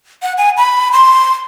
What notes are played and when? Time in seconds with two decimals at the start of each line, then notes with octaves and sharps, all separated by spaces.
0.22 F#5
0.38 G#5
0.57 B5
0.92 C6